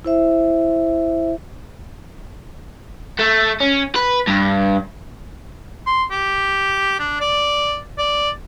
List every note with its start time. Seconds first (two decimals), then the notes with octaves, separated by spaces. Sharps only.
0.05 E4 C5 E5
3.19 A3
3.61 C#4
3.96 B4
4.27 G2
5.87 C6
6.11 G4
6.99 D4
7.21 D5
7.99 D5